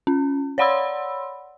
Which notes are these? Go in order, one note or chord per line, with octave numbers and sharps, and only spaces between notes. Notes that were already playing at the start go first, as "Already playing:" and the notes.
C#4
C#5 D5 F#5 B5 C6 E6